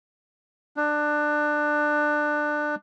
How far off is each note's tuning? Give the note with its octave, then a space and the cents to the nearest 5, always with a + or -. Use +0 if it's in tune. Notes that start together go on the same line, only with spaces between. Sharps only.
D4 +20